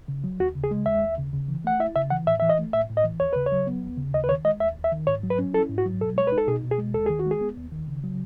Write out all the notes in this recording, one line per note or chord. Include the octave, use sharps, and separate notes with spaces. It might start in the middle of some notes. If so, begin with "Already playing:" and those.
C#3
F#3
D#2 F#4
C#3
G#4
G#3
D#2 E5
D#2
C#3
C#3
E3
A3 F#5
E4 E5
C#3 E5
E3 F#5
A2 E5
E3 E5
D#5
A3
A2 E5
A2
D#5
E3
D#2 C#5
C#3 B4
C#5
F#3
B3
D#2
C#3
D#2 D#5
B4
D#3 C#5
G#3 D#5
D#2 E5
D#2
E5
D#3
G#2 C#5
F#3
B4
C#4
E4 A4
G#2
F#4
F#3
B2 A4
G#3 C#5
D#4 B4
A4
B2 G#4
B2
G#4
G#3
D#2 A4
D#3 G#4
F#4
G#3 G#4
B3
D#2
D#3
C#3
F#3